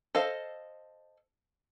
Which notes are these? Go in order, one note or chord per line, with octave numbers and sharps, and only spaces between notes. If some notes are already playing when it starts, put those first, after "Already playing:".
A4 C5 D#5 F5